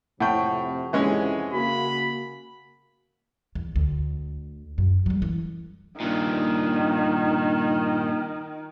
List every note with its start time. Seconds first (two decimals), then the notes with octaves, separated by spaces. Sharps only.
0.20 F2 A2 C3 C4 F#5 G5 A5 C#6
0.93 F2 G#2 C3 E3 G#3 C#4
1.53 C#3 A#3 F#4 B5
3.55 E2
3.76 D2
4.78 F#2
5.06 F#3 G3
5.22 E3 C#4
6.00 G2 A#2 D#3